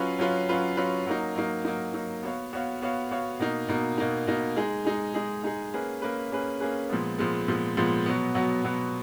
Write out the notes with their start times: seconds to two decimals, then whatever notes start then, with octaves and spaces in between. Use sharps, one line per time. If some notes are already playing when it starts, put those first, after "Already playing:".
Already playing: F#3 C#4 F4 B4
0.19 F#3 C#4 F4 B4
0.49 F#3 C#4 F4 B4
0.77 F#3 C#4 F4 B4
1.06 F#3 A#3 D#4
1.36 F#3 A#3 D#4
1.65 F#3 A#3 D#4
1.94 F#3 A#3 D#4
2.23 B3 F#4 C#5 F5
2.53 B3 F#4 C#5 F5
2.82 B3 F#4 C#5 F5
3.11 B3 F#4 C#5 F5
3.39 B2 A#3 D#4
3.68 B2 A#3 D#4
3.98 B2 A#3 D#4
4.27 B2 A#3 D#4
4.56 G#3 D#4 G#4
4.85 G#3 D#4 G#4
5.14 G#3 D#4 G#4
5.44 G#3 D#4 G#4
5.74 A#3 C#4 G#4 B4
6.02 A#3 C#4 G#4 B4
6.32 A#3 C#4 G#4 B4
6.60 A#3 C#4 G#4 B4
6.89 A#2 F3 G#3 B3
7.18 A#2 F3 G#3 B3
7.48 A#2 F3 G#3 B3
7.77 A#2 F3 G#3 B3
8.06 B2 F#3 B3
8.35 B2 F#3 B3
8.64 B2 F#3 B3